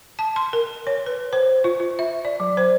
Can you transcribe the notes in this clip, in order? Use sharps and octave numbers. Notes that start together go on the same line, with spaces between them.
A5
C6
A#4
C#5
B4
C5
F4
F4
E5
D5
F#3
C5